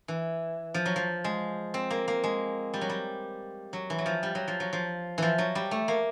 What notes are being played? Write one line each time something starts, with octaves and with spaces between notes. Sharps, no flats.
E3
F3
F#3
F3
G#3
C4
A#3
A#3
G#3
G3
F#3
G3
F#3
E3
F#3
F3
G3
F#3
F3
F#3
F3
E3 F3
F#3
G3
A3
A#3